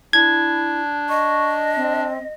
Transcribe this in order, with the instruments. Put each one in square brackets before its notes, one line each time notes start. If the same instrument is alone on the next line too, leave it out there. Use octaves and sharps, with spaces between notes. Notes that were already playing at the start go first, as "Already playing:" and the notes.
[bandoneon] D4 [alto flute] E4 [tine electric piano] G#6
[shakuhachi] D#5 [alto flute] C#6
[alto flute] C4